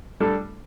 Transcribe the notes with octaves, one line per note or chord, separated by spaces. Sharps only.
G3 D4 A4